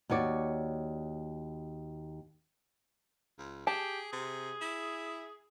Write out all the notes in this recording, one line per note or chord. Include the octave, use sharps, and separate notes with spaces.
D#2 F#4 C#5 D5
C#2
G4 G#4 A5
C3 G#4
E4